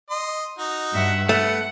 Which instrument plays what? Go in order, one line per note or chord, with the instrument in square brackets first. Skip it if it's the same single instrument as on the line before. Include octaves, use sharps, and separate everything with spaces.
[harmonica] D#5 C6
D#4 F#4
[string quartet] G2 E5 F#5
[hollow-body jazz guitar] A3 [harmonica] B3 A4 [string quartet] F#5